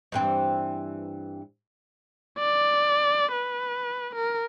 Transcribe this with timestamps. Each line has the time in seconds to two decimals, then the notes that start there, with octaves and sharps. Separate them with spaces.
0.12 G2 E3 C4
2.39 D5
3.32 B4
4.15 A#4